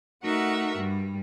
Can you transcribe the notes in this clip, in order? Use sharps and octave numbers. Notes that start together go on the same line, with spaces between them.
A3 D#4 F#4 A#4 E5 F#5
G2 G3